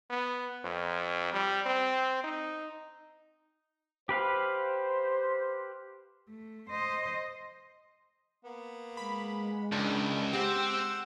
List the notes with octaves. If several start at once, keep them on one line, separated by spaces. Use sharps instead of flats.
B3
F2
G3
C4
D#4
G4 B4 C5 F5
A3
C5 D#5
A#3 B3
G#3 B5
C#2 D#3 D4 E4
C4 G4 C5 F#5 E6